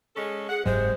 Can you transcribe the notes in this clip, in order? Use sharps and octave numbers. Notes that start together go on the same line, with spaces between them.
G#3 C#4 A4
G#4 F#5
F#1 G#2 C3 F#3 G#3 C5